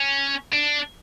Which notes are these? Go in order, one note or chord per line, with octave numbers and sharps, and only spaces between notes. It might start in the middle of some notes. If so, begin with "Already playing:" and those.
Already playing: C#4
D4